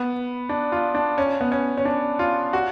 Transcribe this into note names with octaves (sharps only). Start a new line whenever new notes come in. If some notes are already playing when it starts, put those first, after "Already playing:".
Already playing: B3
D4
F4
D4
C#4
B3
C#4
C#4
D4
F4
F#4